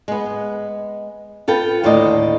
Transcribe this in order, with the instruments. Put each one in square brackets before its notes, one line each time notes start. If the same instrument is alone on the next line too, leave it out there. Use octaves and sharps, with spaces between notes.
[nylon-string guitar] G#3 B3
F4 A4 B4 G5
D#2 A2 D3 C5 D5 D#5